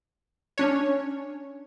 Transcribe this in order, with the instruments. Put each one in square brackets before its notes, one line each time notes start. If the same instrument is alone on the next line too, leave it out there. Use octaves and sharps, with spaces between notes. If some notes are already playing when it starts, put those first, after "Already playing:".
[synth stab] C#4 D4 C#5